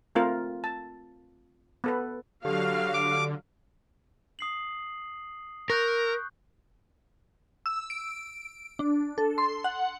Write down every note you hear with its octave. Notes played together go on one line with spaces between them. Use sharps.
A3 C4 F4 A#4
A5
B3 A4 B4
D3 F#3 G4 A4 F5
D6
D#6 C7 F#7
A#4 C#6 F#6 G6
E6
D7
D4
A4
C6
F#5